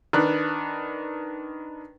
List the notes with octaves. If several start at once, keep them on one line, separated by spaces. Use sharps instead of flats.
D#3 D4 B4 F#6